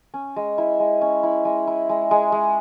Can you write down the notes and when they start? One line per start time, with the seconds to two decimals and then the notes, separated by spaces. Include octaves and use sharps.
0.14 C#4
0.36 G#3
0.58 E4
0.80 G#3
1.01 C#4
1.23 E4
1.45 G#3
1.67 E4
1.89 G#3
2.11 G#3
2.32 G#3